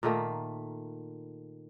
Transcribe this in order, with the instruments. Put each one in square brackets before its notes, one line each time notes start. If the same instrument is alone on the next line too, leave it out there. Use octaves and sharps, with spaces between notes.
[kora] A#2 D#3 A3 A#3